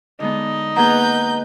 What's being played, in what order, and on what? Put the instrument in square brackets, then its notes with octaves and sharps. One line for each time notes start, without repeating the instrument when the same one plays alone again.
[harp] D3 G#3 B3 [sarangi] D#4
[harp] A#3 B3 G#4 [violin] B4 G6 [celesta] F#5 A#5